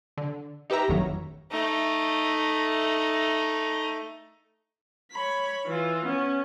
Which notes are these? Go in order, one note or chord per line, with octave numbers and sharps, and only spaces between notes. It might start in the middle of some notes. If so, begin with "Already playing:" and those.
D3
D#4 G4 B4 E5 A#5
G1 F2 A2 D#3 F#3
A3 D#4
C#5 B5
E3 F4
B3 C#4